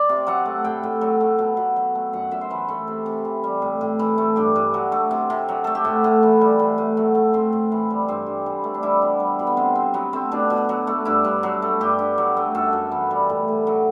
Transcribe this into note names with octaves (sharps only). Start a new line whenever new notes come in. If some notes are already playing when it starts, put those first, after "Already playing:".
Already playing: D5
C3
F#3 F#5
A3
A2 G5
A2
F#3
A3
B2
B2
F#3
A3
F#2 F#5
F#2 E5
C5
E3 B4
A3 A4
C3
C3
E3
G3
A2
A2
E3
A3
G2 G4
G2
F#3
A3
C3
C3
F#3
A3 A4
G4
A2 F#4
A2
E3
G3
A2
A2
F#3
A3
A2 C4
A2
E3
G3
G2 C4
G2
E3
A3
D4
G3 E4
B2
G3
B2
B3
C3 C4
C3 C4
F#3 B3
A3 C4
B2 D4
B2
F#3
A3
G2 E4
G2
F#3
A3
G2 G4
G2
F#3
A3
F#2 A4
F#2
E3
G3
A2
A2
F#3